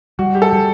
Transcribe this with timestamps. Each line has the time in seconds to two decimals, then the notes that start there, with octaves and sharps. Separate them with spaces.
0.19 G3 F#4
0.35 G4
0.42 A4
0.53 G3